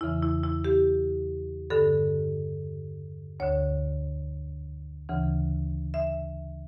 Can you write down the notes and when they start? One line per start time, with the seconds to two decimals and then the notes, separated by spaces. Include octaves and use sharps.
0.01 E2 C#3 E3 E4
0.23 E4
0.44 E4
0.64 G4
1.70 G2 D3 A4
3.40 D2 D3 C#5
5.09 D2 C#3 E3
5.94 E5